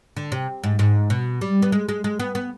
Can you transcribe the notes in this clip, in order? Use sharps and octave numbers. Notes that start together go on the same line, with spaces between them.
D3
C3
G#2
G#2
B2
G3
B3
G#3
G#3
G#3
B3
B3